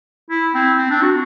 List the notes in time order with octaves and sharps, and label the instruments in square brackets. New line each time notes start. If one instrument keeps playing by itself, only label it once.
[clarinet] E4
C4
C4
D4
F#4